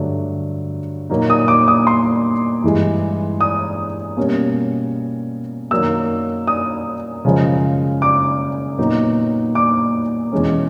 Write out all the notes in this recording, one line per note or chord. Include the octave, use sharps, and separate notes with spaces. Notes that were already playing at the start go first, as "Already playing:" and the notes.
Already playing: G2 D3 F#3 A3 D4
A#2 F#3 A#3 D#4
D#6
D6
D#6
C6
G2 E3 G#3
D#6
B2 G3 A#3 C#4
F#2 D#3 F#3 A#3 E6
D#6
F#2 C#3 F3 G#3
D6
A#2 F#3 B3 D#4
D6
E2 B2 G#3 C#4